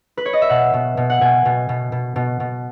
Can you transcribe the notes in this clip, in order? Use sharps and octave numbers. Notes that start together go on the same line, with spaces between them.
B4
C#5
D#5
E5
B2 F#5
B2
B2
F#5
B2 G#5
B2
B2
B2
B2
B2